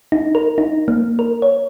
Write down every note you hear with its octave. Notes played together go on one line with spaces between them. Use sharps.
D#4
A#4
D#4
A#3
A#4
C#5